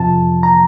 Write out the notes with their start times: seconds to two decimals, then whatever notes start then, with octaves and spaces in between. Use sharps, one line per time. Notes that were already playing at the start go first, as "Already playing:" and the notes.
Already playing: F2 C3 F3 A5
0.43 A#5